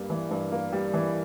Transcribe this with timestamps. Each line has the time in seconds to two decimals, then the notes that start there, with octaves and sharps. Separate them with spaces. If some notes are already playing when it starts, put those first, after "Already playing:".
Already playing: G2 G3 A#3
0.10 E3
0.31 G2
0.52 A#3
0.72 G3
0.94 E3